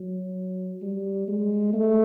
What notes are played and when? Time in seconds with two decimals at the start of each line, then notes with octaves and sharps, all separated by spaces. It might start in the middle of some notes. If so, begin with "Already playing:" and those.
Already playing: F#3
0.82 G3
1.28 G#3
1.73 A3